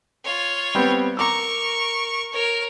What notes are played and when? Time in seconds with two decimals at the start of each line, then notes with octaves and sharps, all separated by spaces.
0.24 F4 C#5
0.75 G3 B3 C4
1.17 A#4 A#5 C#6 D6 E6
2.32 A#4 C#5